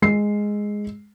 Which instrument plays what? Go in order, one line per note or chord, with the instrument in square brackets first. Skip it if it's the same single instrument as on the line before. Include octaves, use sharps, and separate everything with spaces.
[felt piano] G#3 C7